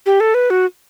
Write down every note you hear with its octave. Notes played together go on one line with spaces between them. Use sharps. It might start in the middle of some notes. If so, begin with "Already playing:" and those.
G4
A4
B4
F#4